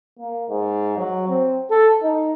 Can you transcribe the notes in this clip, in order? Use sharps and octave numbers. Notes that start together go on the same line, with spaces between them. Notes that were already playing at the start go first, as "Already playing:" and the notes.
A#3
G#2
F#3
C4
A4
D#4